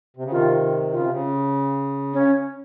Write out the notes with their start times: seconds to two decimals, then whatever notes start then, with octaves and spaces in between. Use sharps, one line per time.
0.17 C3
0.24 C#3
0.31 C3 D#3 F4
0.92 C#3 F4
1.01 C3
1.11 C#3
2.13 C#4